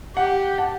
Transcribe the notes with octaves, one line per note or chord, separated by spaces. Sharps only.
G4 F#5
F#5 A5